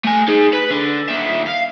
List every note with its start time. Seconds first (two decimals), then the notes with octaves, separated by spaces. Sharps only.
0.04 A3 G#5
0.28 D#4 G#4
0.53 B4 B5
0.71 D3
1.09 D#2 E5
1.47 F5